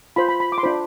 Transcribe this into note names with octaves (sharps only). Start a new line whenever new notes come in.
F4 C5 B5
B5
B5
D6
C6
D4 F4 C5 B5